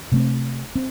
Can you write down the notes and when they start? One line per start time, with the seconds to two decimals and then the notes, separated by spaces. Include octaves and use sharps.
0.12 C3 A3 C4
0.75 C4